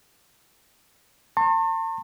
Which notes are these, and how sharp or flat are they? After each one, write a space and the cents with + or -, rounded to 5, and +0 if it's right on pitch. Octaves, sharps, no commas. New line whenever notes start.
A5 +45 C6 +45